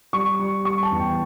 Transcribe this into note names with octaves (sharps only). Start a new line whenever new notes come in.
G3 C#6
G3
G3 C#6
A5
E2
G5